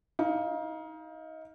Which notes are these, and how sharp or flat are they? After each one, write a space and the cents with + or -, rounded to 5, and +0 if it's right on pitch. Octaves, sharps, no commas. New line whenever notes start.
D#4 +30 F5 +0